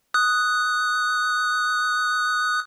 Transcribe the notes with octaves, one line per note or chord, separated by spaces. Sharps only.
D#6 F#6